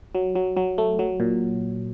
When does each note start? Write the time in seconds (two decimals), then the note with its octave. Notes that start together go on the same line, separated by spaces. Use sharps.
0.15 F#3
0.35 F#3
0.57 F#3
0.78 A3
0.99 F#3
1.20 A#2